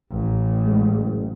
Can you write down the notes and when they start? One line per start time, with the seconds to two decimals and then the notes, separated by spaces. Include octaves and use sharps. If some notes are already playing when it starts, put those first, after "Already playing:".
0.12 A1
0.66 G#3
0.98 F#1